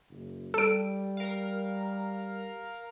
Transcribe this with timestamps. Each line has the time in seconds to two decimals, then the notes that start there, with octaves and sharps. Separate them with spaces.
0.10 F#1
0.54 G3 A4 D7
1.17 A#4 F5